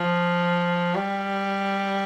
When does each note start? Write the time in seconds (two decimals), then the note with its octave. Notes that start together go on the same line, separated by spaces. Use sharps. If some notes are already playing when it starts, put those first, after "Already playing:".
Already playing: F3
0.95 G3